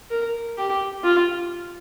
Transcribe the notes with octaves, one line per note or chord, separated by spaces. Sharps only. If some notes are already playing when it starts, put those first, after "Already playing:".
A#4
G4
F4